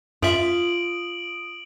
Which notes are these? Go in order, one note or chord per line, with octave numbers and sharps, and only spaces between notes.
F#2 F4 E5 D#6 D7 F#7